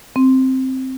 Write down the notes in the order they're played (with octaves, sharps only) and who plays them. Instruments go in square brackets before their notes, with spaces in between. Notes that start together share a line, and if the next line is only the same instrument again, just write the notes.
[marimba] C4